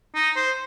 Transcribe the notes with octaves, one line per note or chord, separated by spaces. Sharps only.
D#4
C5